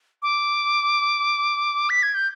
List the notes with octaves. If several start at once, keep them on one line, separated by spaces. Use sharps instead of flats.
D6
B6
G#6
G6